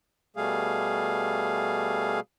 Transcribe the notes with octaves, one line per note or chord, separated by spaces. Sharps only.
B2 G3 A3 G#4 F5